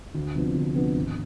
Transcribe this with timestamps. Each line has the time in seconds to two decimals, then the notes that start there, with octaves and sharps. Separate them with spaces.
0.14 D2
0.35 C3 F3 B3 D4
0.55 D2
0.76 C3 F3 B3 D4
0.95 G#1